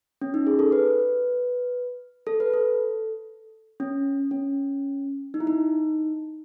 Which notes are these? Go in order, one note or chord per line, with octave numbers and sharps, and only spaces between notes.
C#4
D#4
G#4
A4
B4
A4
B4
A4
C#4
C#4
D#4
E4
D#4